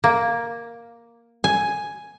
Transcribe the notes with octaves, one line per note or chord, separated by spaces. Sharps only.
A#3
G#5